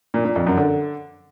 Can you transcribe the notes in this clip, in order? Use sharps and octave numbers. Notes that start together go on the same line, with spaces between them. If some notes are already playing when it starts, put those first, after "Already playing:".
A#2
A#2
F2
F#2
D3